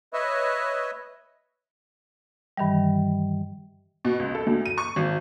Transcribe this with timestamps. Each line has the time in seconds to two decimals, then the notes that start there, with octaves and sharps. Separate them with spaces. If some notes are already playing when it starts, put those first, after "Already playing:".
0.13 B4 C#5 D#5 E5
2.57 G2 D#3 E3 G3
4.05 B2
4.19 C#2
4.35 A4
4.46 D2
4.66 D#7
4.78 C#6
4.96 G#1